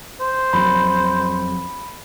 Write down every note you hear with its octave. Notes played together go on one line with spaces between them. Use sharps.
C5
F2 F#3 B5